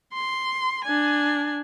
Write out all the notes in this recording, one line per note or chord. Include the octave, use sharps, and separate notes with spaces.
C6
D4 G#5